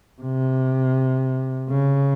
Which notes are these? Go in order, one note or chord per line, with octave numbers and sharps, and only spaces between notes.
C3
C#3